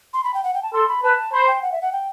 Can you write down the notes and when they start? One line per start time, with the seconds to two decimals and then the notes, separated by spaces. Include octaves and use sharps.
0.14 C6
0.24 B5
0.34 G5
0.44 F#5
0.54 G5
0.63 A5
0.73 A4 C6
0.89 B5
1.03 B4 A5
1.33 C5 B5
1.47 G5
1.62 F#5
1.72 E5
1.82 F#5
1.92 G5